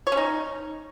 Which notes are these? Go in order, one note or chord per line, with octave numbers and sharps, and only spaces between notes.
C#5
C#4
D#4